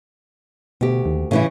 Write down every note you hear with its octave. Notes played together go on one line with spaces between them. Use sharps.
D2 B2 G4
D#2
A2 C#3 E3 E4